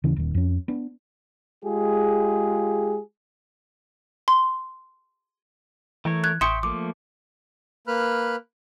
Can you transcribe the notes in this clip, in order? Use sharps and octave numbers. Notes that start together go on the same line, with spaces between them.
D#1 C#3 E3
D#1 D#3
F2 C#4
B3 D4
G#3 F4 G4 G#4
C6
E3 A3 A#4 C#5
F#6 G#6
A1 E5 G5 C6 C#6 D#6 C#7
F3 A3 A#3 D6
A#3 B4 B5 F6 F#6